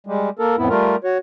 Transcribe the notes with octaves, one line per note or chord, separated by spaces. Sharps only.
G3 G#3
A#3 A4 A#4
F2 A2 B3 E4
G3 A3 F4 A#4
F#4 C#5